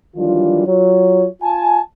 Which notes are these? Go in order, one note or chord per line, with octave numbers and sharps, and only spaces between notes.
D#3 E3 F#3 G3 D4 F4
F#3 F4 C#5
F4 G#5 A5